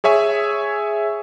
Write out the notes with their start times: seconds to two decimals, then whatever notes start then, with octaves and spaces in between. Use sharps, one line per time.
0.04 G#4 C#5 E5 G#5 E6